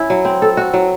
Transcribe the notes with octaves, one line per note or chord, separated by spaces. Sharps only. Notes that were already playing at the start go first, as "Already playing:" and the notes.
Already playing: C#4 E4
F#3
C4
A4
F#4
F#3